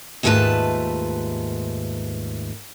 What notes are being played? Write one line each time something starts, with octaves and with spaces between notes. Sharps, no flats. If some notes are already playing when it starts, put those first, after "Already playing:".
D#2 G#2 A3 F4 B4 A5